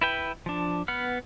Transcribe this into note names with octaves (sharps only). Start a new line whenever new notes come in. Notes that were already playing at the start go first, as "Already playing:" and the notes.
E4 B4 G5
F3 D4
B3 B4 F#5 F6